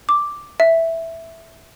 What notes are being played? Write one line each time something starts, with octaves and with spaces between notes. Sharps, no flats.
D6
E5